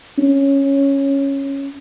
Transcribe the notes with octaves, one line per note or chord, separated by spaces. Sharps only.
C#4